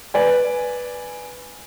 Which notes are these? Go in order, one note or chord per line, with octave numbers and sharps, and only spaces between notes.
B4 D5 G#5